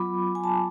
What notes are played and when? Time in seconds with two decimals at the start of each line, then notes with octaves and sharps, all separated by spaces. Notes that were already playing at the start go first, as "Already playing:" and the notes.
Already playing: F#3 B3 F4 B5 D6
0.35 G#5
0.44 A5